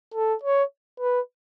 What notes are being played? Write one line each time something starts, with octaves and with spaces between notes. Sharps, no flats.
A4
C#5
B4